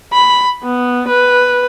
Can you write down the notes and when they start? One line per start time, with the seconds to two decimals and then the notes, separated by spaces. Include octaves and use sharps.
0.13 B5
0.63 B3
1.08 B4